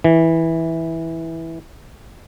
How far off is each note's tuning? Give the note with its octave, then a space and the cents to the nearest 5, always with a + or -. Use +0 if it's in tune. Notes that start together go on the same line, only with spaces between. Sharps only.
E3 -10